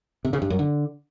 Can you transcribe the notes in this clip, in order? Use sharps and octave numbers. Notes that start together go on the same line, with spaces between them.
C3
C#3
G2
F#2
D3